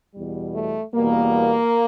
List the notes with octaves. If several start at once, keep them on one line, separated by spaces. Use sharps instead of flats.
E2 B2 G3
A3
E2 B2 G3 A#3